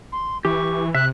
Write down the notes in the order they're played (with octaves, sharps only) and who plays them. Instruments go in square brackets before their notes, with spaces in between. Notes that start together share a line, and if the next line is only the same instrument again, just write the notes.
[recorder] C6
[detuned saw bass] E3 [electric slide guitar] G4 [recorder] C#6
[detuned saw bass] C3 [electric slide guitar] E5 [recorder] F#6